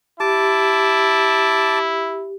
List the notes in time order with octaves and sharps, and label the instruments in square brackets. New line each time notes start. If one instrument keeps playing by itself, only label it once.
[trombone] E4 [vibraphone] G4 [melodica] A5 D6